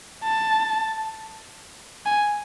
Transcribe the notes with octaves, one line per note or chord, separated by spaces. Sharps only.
A5
G#5